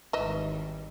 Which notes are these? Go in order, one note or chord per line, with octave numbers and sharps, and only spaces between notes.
G#1 D#3 E3 G3 D#5 E5